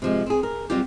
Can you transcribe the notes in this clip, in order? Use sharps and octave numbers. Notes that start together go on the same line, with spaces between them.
C3 F3 G#3
C4 G#4
A#4
F#3 G3 C4 F4 G4